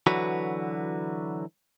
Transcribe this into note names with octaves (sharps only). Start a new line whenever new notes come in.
D3 E3 F#3 F#4 B4